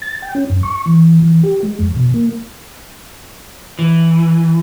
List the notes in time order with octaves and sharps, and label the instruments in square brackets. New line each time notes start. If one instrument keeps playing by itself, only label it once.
[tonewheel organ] A6
G5
C#4
F#2
C#6
E3
E3
G4
G#3
F2
B2
A#3
[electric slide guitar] E3